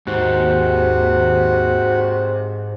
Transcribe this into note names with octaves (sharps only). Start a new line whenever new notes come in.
D#2 G#2 C3 F#4